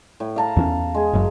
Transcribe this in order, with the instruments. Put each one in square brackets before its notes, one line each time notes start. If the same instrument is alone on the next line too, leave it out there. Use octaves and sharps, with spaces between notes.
[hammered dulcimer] A2
F5 A5 A#5
[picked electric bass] E2 A3 C#4
[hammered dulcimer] G#3 G#4
[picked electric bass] F#1 F#2